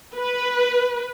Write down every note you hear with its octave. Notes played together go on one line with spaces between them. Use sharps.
B4